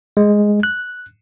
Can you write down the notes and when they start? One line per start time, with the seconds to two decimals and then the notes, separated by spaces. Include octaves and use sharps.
0.17 G#3
0.63 F#6